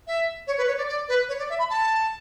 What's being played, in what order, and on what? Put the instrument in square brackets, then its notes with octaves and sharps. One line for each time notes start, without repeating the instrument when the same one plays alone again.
[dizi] E5
C#5
B4
C#5
D5
D5
B4
C#5
D5
E5
B5
A5